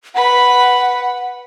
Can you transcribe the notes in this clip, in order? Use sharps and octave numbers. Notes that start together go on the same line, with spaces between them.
B4 F#5 B5